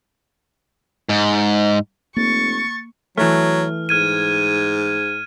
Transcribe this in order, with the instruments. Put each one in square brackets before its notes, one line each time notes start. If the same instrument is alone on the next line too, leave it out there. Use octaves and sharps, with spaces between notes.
[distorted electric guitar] G#2
[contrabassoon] F1 [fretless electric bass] A#3 [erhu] C#6 [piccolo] A6
[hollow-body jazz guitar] E3 A3 [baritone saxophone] F#3 [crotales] F6
[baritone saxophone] G#2 [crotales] F6 G#6 D#7